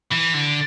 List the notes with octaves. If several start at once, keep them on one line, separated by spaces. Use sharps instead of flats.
E3
D3